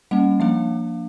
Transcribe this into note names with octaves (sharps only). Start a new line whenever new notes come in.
G3 A#3 C#4 F#5
F3 A#3 D4 F5